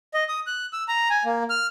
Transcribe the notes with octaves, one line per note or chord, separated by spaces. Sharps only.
D#5
D#6
F#6
E6
A#5
G#5
A#3
F6